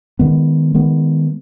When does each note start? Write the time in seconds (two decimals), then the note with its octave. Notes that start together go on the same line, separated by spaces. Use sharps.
0.19 D#3 G#3 B3
0.74 D#3 G#3 B3